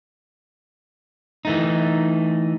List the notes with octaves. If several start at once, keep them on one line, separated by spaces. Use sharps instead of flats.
E3 A3 D#4